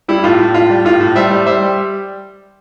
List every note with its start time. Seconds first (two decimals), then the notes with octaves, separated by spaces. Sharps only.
0.08 G3 E4
0.24 A2 F4
0.39 A2
0.54 A2 F4
0.70 G3
0.84 A2 F4
1.00 A2
1.15 G3 C5 E5
1.31 G3
1.46 G3 C5 E5
1.62 G3